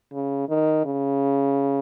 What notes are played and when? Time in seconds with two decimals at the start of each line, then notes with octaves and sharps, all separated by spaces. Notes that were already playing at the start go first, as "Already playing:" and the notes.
0.13 C#3
0.49 D#3
0.85 C#3